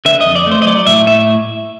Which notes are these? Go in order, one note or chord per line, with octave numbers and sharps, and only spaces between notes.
D3 E5
D#5
F2
D5
A3 C5
D#5
F#3 D5
A2 E5
A2 E5